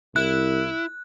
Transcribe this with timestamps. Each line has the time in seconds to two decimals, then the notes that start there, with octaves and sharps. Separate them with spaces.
0.16 C2 E4 F#6